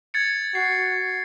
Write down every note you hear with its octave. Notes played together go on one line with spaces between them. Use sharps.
G#6 A6 C#7
F#4 C7